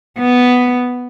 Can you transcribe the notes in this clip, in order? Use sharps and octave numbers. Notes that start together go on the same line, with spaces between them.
B3